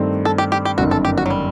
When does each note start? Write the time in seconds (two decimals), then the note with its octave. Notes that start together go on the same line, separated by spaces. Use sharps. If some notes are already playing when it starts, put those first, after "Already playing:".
Already playing: G2 D#3 A3 C4
0.25 A4
0.38 G4
0.52 G4
0.65 G4
0.78 G1 F#2 D#3 F#4
0.91 A4
1.05 G4
1.18 F#4
1.26 F#3
1.30 G3